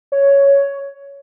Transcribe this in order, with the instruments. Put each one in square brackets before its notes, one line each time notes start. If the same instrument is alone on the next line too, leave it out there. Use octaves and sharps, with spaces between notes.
[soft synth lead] C#5